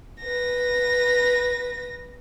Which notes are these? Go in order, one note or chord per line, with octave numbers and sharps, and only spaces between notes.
B4 A#6